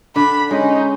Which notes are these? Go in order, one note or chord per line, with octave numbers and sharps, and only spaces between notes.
D3 B5
G#3 C#4 D#4